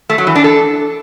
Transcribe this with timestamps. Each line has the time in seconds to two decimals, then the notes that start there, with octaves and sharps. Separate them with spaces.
0.10 A3
0.18 F#3
0.27 E3
0.35 D4
0.44 A4